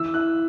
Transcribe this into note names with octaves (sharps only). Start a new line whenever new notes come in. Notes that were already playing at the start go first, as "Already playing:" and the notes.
Already playing: E3 E6
E4 F#6